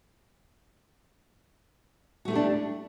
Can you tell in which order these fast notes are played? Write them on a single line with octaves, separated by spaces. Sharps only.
F#4 A3 E4 G4 D4